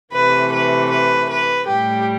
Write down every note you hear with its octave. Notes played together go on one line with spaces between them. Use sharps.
C3 E3 A3 B4
B4
B4
B4
A2 G3 G4